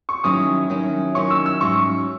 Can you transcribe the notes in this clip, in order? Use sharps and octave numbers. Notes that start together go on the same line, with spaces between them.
C#6
D#3 F#3 C#4 E4 D#6
D#3 F#3 C#4 E4
D#3 F#3 C#4 E4 C#6
E6
E6
G#2 F#3 C#4 C#6